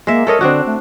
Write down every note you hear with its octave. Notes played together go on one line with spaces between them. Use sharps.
G#3 A#3 E5
A4 A#4 C#5 D#5
D3 C4 D4 F#4
A3